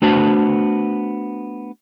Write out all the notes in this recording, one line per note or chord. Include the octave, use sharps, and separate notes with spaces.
A3 B3 D4 F#4 C5 A5